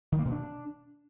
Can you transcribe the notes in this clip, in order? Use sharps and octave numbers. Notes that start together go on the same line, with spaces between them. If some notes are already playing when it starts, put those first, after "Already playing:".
D#3
A#3
B2
D4